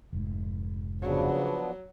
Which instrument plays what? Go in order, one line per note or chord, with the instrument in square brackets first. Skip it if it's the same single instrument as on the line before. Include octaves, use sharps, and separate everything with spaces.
[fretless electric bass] F1 G#2
[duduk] C#3 [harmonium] F3 B3 D4 [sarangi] F#3